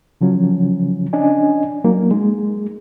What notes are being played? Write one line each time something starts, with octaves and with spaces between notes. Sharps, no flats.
C#3 F3 F#3 C#4
C#4 D4 D#5 G#5
F#3 A#3 D#4
G#3